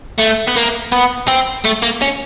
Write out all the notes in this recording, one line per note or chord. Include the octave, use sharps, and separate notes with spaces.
A3
B3
A#3
B3
C4
A3
A#3
C#4